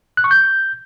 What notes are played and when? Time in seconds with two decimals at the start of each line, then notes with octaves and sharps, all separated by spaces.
0.17 F#6
0.24 C#6
0.31 G6